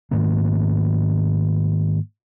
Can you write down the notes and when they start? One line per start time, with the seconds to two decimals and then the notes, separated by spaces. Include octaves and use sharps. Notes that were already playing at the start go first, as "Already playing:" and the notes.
0.11 G#2 D#3 A3 A#3